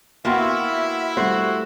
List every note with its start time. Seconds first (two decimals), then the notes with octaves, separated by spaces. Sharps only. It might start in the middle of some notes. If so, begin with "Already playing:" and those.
0.25 A#3 B3 E4 F#4 E5 G5 C6
1.17 G3 A3 F#4 C5